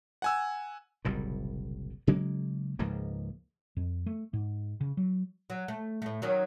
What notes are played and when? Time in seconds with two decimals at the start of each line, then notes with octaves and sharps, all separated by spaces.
0.22 F#5 G#5 E6
1.05 F#1 C2 A#2
2.07 C#3 F#3 G#3 A#3
2.79 C#2 G#2 F3 A#3
3.77 F2
4.06 A3
4.33 G#2
4.81 C#3
4.97 F#3
5.50 F#3
5.68 A3
6.02 A2 A3
6.22 D#3 F#3 C#4